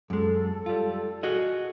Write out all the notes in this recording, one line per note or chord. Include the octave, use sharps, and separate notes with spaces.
F#2 G#3 A4
G3 F4
F#4 G#4 D#5